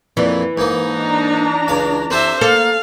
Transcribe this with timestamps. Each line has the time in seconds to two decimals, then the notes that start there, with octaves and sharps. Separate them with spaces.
0.17 F2 A#2 E3
0.58 G#2 A#3 D#4
0.89 D4 A#5
1.68 C#2 F5
2.10 C4 G4 A4 C5 E5
2.41 A#3 A4 F5